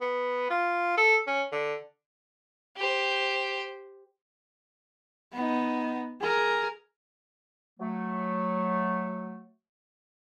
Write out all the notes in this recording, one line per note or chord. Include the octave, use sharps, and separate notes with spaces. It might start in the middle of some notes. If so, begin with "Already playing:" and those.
B3
F4
A4
C#4
D3
G4 C5
B3 D#4
G#4 A#4
F#3 A3